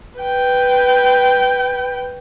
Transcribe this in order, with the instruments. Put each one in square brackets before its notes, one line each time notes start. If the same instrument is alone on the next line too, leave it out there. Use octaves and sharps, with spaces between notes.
[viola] B4 G5